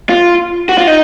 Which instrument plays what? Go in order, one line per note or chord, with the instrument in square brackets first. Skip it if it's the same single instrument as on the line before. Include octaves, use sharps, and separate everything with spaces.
[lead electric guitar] F4
F#4
F4
D#4